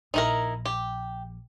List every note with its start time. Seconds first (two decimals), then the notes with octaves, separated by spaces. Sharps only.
0.14 A#1 D#4 E4 A#4
0.66 G4